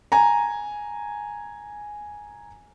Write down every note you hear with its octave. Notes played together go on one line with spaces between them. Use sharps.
G#5 A#5